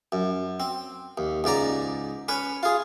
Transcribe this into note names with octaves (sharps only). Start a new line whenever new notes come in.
F#2
C4
D#2
C#2 G#2 D5 A#5
C#4 B4 C#5
F4 G#4